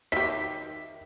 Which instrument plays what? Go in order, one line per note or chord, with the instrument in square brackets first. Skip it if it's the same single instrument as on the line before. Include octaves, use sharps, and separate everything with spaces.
[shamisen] D#3 G4 [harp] E5 [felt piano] B6